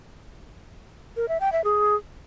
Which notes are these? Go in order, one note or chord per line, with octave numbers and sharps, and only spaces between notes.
A#4
E5
G5
E5
G#4